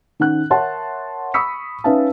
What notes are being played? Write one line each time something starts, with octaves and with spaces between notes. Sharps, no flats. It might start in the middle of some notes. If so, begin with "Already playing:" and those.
D#3 C#4 F#5 F#6
A#4 C#5 E5 F#5 A5 C6
B5 C#6 D#6 E6 B6 C#7
C#4 D#4 B4 E5 F5 A5